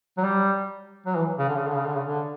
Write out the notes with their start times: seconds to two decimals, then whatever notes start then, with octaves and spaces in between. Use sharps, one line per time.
0.17 F#3
0.23 G3
1.06 F#3
1.16 E3
1.39 C#3
1.48 D3
1.57 C#3
1.67 D3
1.77 C#3
1.86 D3
1.96 C#3
2.06 D3